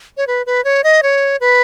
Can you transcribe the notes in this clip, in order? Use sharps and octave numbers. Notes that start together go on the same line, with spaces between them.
C#5
B4
B4
C#5
D#5
C#5
B4